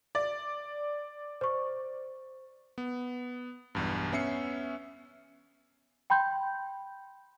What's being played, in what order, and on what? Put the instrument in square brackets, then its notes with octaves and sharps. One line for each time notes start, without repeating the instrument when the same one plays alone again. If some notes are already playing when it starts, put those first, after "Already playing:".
[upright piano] D5
[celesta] C5 C#6
[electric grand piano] B3
B1 E2 G2
B3 C#4 E5 C7 C#7
[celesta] G5 B5 C6 G6